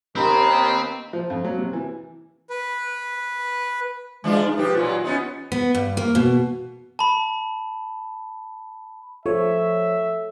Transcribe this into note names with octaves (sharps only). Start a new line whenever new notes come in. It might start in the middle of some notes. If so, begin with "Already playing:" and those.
D#2 C4 D#4 C5 B5
F3
F2
F#3
C3
E3
B4
E3 G#3 D4 F4
D#4
F3 G4 B4
A#2 E3 F#3 F4
B3 C#4 D#4
B3
G2
A#3
B2
A5 B5
F3 A4 C#5 E5